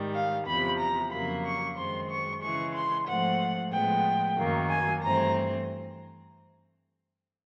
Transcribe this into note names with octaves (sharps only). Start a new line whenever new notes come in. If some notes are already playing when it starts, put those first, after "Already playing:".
Already playing: G#2 D#3 G3
F5
E2 C3 F3 B5
A#5
F2 C#3 F#3 A#3 B5
C#6
F#2 D#3 G#3 C4 C6
C#6
C#3 E3 G#3 C#6
C6
G#2 F3 A3 C4 F#5
A2 F3 G#3 B3 G5
F#2 D#3 F#3 A#3
G#5
G2 E3 A3 C4 A#5